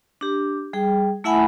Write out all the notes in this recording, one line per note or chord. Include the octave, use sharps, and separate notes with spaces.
D4 G4
G3 G#4 G5
A3 E4 E5 F#5 G#5 B5